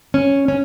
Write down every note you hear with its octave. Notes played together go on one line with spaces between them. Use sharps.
C#4
C#4